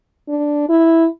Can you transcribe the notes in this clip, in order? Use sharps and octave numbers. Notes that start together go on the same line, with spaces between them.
D4
E4